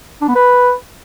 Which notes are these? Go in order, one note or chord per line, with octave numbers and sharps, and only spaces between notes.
D4
B3
B4